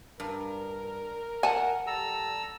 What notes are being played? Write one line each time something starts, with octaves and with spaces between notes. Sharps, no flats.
G2 A#4
F#5 G#5 A5
G3 A4 A#5 E6